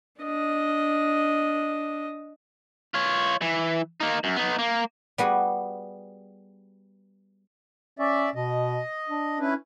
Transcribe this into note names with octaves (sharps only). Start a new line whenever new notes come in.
D4 D#5
F4 C#5
E3
A#3 D#4
F#2
B3 D#4
A#3
G3 B3 F#4 G#4
C#4 D5 E5
B2 D#5
D4
C#4 E4 B4